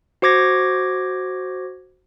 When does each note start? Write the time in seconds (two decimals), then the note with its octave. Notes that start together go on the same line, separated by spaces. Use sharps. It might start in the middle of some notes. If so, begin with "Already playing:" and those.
0.22 F#4 C5 D6 G#6 A#6